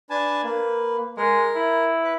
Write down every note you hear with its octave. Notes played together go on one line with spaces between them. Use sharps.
D4 B4 G#5 A5
A#3
G#3 A#4
E4
B4